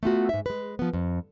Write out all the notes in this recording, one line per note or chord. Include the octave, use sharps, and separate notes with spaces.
A3 B3 F4 F#4
G#2 E5
G#3 B4
F3 B3
F2